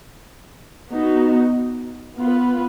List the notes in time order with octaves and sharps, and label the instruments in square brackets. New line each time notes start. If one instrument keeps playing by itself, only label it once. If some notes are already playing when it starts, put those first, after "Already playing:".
[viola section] B3 D#4 F#4
B3 F4 B4